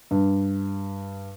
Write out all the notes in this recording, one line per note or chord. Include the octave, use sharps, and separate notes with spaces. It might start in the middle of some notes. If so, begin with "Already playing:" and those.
G2